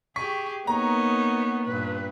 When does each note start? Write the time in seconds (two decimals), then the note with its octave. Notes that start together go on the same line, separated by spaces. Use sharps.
0.16 G4 G#4 C#6 B6
0.67 A#3 B3 D#4 C#5 A#5
1.67 G2 A#2 B4